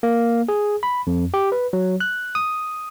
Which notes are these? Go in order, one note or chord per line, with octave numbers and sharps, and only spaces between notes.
A#3
G#4
B5
F2
G4
B4
F#3
F#6
D#6